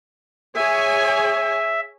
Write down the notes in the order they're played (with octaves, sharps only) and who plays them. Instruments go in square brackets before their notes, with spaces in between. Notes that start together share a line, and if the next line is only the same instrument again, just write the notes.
[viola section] G#4 C#5 G#5 [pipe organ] E5